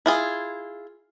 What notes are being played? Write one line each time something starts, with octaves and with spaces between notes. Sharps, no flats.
E4 F4 G#4